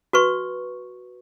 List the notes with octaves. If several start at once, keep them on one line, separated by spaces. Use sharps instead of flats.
F#4 B4 C#6